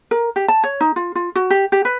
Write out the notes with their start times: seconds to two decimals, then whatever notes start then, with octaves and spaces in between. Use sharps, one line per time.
0.11 A#4
0.36 G4
0.48 A5
0.64 C#5
0.81 D#4
0.96 F4
1.15 F4
1.35 F#4
1.50 G4
1.72 G4
1.85 B4